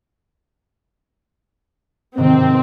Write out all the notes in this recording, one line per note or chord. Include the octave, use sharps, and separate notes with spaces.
G#2 C3 D#3 C4